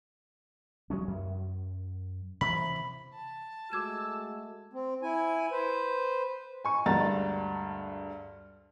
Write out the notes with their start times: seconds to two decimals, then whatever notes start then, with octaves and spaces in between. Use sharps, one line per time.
0.90 F#3 G#3 C#4
1.08 F#2
2.41 C3 E3 B5
3.14 A5
3.72 G#3 A3 F#4 D6 E6 G#6 E7
4.73 C4
5.03 E4 G#5
5.51 B4 C5
6.65 G#5 C#6
6.86 D2 G2 G#3 F#5 A#5 A6